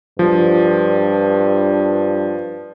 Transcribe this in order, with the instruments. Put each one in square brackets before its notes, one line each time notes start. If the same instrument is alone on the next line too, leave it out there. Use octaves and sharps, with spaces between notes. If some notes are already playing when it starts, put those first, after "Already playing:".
[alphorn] G2 [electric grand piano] F3